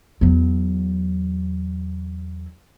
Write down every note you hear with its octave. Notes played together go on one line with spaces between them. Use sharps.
E2 F#3